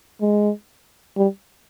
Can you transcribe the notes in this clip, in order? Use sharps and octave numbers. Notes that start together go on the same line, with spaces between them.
G#3
G3